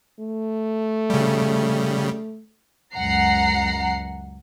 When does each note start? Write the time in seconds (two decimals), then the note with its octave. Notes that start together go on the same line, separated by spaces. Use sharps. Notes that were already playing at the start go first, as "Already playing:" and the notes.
0.19 A3
1.10 C#3 G3
2.94 C#2 F#2 F#5 A#5 C7